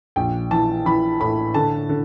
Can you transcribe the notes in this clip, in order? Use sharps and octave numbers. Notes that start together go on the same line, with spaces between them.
A#1 G5
E3 A5
E3 B5
A2 B5
D3 A5
D3